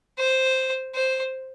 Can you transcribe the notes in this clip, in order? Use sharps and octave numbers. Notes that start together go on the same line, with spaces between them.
C5
C5